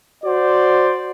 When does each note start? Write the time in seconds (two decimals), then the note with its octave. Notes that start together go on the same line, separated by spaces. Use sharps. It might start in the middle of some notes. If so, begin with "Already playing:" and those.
0.24 F#4 C5 D5